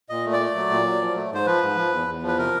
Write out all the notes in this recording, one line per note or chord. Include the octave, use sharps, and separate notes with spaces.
A#2 D#5
A3
D5
A3
F#3
A#2
F#3
F3
A3
G#2 C5
F3 B4
G#2
F3
E2
E2
F3
B4
C3 A#4